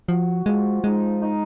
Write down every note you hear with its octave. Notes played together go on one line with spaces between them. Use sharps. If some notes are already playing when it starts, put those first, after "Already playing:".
F3 F#4
F3 G#3
G#3 D#4
D#4